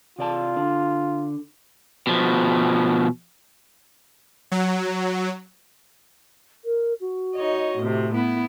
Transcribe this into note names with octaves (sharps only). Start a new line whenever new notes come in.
C3 F4 D5 A5
D3
B2 F3
F#3
A#4
F#4
D#4 C#5 D#5
A2 C3
B3 E4